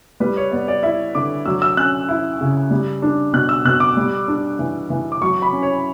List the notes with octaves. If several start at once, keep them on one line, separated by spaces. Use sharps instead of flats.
G3 B4
C#5
B3 D5
D5
E4 E5
D3 D6
F#3 E6
E6
C#4 F#6
E4
C#3
G3
D4
B2 F#6
E6
B2 F#6
D6
G3
D4
E3
E3
D6
F#3 C#6
B5
C#4
C#5